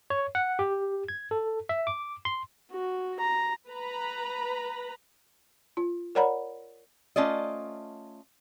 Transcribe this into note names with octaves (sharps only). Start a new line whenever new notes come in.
C#5
F#5
G4
G#6
A4
E5
D6
C6
F#4
A#5
B4 A#5 B5
F4
A#4 C#5 D5 F#5 A#5 B5
A3 C#4 F4 D5 D#5